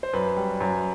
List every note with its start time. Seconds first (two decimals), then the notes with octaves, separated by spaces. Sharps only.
0.03 C5
0.13 F#2 B4
0.37 G3
0.61 F#2